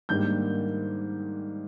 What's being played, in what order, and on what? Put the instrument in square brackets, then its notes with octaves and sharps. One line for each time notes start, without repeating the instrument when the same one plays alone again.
[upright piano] G#2 D#3 G3 A#3 D4 G6